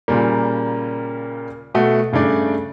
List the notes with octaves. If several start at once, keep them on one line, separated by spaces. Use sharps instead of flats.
A#2 C#3 G3 A#3
B2 A3 F#4
G2 C#3 A3 D4 D5